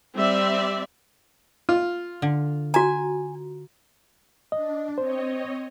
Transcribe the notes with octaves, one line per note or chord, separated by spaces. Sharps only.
G3 C4 D5 E5
F4
D3
F#4 G#5 A#5
D4 D#5
C4 C5 C#5 D#5